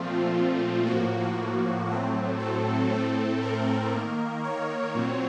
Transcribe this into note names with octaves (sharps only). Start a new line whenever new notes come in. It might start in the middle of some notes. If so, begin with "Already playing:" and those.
Already playing: A#2 F3 A3 C4 F4
A2 F3 A#3 F#4
A2 F#3 A3 C4
A4
A2 A3 C4
A#4
D#3 A#3
C#5
A#2 F#3 C4